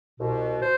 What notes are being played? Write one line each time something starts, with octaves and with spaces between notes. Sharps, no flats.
C2 B2
C5